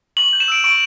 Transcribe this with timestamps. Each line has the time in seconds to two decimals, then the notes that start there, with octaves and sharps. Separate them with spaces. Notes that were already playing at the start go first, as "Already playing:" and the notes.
0.17 C#6 F#7
0.29 G6 F#7
0.40 E7
0.48 E6 D7
0.64 C#6 D7